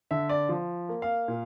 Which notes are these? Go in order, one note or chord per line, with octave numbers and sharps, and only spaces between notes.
D3 E5
D5
F3
A#3
F5
A#2